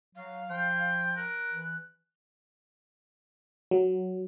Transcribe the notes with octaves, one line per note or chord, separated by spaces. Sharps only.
F#3 F5
F3 G5
A#4 F#6
E3
F#3